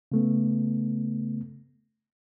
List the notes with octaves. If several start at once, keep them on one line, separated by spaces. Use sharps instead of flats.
C#3 A3 B3